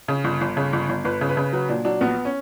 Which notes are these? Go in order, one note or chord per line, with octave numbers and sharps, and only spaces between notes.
C#3
G1
G1
C#3
G1
G1
G1 B4
C#3
B4
C#3
F#3 B4
A#2 D4
F#3 D4
A#1 B3
C#4